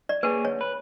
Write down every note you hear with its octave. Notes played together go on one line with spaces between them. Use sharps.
D5
A#3 G#4 B4 C#5
D2 C#5
B4